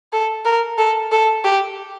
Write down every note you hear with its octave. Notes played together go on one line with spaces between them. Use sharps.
A4
A#4
A4
A4
G4